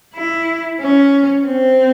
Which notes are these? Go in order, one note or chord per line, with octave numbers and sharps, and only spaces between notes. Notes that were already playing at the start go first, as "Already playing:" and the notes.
E4
C#4
C4